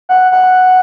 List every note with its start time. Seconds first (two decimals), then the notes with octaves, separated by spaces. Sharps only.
0.09 F#5
0.31 F#5